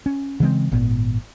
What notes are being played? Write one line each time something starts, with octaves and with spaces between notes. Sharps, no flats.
C#4
C#3 E3 G#3 C4
G#1 A#2 B3